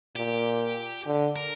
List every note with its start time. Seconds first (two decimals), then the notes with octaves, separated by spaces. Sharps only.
0.16 A#2 G4
1.06 D3
1.36 A#4